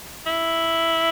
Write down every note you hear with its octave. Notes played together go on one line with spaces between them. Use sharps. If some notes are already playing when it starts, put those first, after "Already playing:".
E4